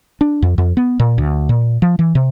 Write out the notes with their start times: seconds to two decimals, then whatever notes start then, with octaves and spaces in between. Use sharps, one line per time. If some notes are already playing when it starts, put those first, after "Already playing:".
0.21 D4
0.42 F2
0.58 F2
0.77 B3
1.00 A#2
1.18 D2
1.49 A#2
1.82 F3
1.99 E3
2.15 C3